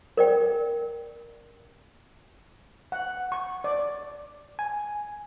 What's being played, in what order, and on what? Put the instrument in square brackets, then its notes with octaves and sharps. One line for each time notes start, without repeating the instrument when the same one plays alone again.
[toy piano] A#4 D5 G5
[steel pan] F#5
C#6
D5
[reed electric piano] G#5